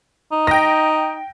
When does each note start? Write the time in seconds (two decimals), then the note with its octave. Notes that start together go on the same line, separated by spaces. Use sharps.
0.32 D#4
0.47 G5 A#6